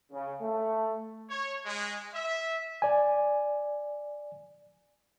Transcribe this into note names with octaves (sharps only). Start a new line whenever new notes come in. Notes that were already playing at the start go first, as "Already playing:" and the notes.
C#3
A3
C#5
G#3
E5
D5 G#5